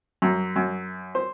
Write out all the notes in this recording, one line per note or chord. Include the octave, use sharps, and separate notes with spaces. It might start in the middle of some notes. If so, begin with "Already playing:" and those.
F#2
F#2
C5